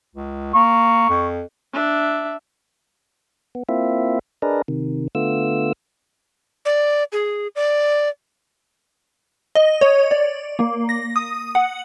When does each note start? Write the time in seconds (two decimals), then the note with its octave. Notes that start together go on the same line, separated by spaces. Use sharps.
0.15 C#2
0.54 A#3 C#6
1.09 F2
1.73 D4 E5
3.55 B3
3.69 A#3 C4 E4 F4 E5
4.42 D4 G#4 A#4 B4 D5 D#5
4.68 C3 D#3
5.15 D3 A3 B3 F4 E6
6.65 D5
7.12 G#4
7.56 D5
9.55 D#5
9.81 C#5
10.11 D5
10.59 A#3
10.89 A#6
11.16 D#6
11.55 F#5